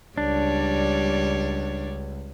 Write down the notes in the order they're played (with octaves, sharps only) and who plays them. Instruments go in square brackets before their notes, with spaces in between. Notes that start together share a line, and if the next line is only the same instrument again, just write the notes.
[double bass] C#2 [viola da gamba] G3 C#5 D5 [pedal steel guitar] D4